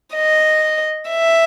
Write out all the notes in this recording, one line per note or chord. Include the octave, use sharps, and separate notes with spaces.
D#5
E5